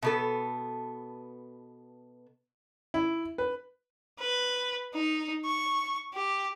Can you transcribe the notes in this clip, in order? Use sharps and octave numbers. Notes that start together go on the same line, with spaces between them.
B2 B3 A4
E4
B4
B4
D#4
C#6
G4